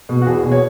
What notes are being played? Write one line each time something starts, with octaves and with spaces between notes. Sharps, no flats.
B2
F#4
E2 G#4
B2
C#5